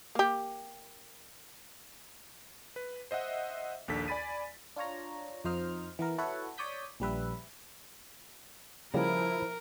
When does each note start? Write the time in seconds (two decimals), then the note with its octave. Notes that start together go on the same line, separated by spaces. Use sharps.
0.15 A#3 G4
2.76 B4
3.11 C5 D#5 E5 F#5
3.88 A#1 D#2 D4 A4 B6
4.08 D5 G#5 B5 A6 D#7
4.76 D4 F4 C#5 A#5
5.44 F2 F3 D#4 C5 D#5 F6
5.99 E3 B3 A#4
6.18 E4 F#4 A4 B4 C#5 F#5
6.58 C#5 D5 D#6 G6 B6
7.00 A#1 G3 B4 E5
8.94 C#3 F3 G3 A#3 E4 A#4